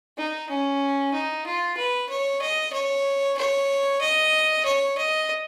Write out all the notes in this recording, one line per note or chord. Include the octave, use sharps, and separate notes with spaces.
D#4
C#4
D#4
F4
B4
C#5
D#5
C#5
C#5
D#5
C#5
D#5